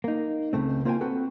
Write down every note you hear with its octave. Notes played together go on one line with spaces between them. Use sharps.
A#3 D#4
C#2 C#3 A3 C4
A#3 F4 C5 D#5 G5 G#5
C4 F#4 A4 B4